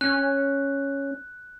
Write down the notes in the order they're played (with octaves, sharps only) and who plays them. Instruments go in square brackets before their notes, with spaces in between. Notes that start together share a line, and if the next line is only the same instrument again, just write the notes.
[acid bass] C#4 [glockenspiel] F#6